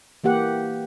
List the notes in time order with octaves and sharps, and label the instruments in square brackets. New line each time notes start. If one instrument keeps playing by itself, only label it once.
[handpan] E3 A#3 G4 F#5